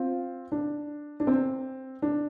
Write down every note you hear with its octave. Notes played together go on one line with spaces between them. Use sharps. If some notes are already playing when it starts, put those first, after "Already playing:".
Already playing: C4 F4
D4
D4
C4
D4